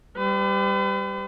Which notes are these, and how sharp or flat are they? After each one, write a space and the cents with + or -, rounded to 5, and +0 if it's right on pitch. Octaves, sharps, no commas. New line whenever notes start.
G3 +0 B4 +45